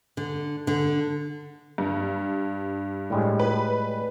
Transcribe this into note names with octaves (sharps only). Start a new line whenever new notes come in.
D3
D3
G2
A2 G3 G#3
B4